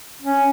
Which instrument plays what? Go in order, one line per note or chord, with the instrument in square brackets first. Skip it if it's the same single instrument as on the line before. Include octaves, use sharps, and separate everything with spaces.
[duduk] C#4